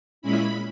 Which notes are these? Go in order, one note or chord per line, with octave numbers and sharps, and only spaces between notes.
A#2 G#3 C#4 E4 B5